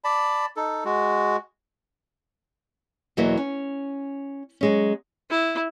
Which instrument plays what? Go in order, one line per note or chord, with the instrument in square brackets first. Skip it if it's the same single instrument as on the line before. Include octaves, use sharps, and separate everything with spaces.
[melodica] D5 A5 B5
D#4 A4
G#3 F#4
[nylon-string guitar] E2 B2 F#3 A#3 E4 D#5
C#4
F#3 G#3 C#4
[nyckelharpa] E4